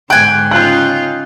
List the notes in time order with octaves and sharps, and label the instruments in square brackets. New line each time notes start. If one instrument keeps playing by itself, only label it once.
[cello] G#2 D3 [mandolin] G5 G#5 [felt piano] F#6
[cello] C#3 D#4 [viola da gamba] F4 [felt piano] F#6 G6